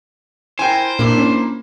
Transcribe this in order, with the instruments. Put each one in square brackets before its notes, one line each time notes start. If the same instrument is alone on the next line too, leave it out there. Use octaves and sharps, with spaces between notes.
[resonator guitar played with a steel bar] E4 F4 A#4 [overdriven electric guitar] C5 [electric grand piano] G5 G#5
[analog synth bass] A#2 [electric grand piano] A#3 [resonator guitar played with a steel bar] D4 E4
[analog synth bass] C#4